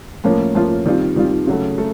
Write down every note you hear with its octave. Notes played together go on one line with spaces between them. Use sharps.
A2 F3 A#3 C#4 F4
A2 F3 A#3 C#4 F4
D#3 G3 C4 F4
D#3 G3 C4 F4
C#3 F#3 A3
A3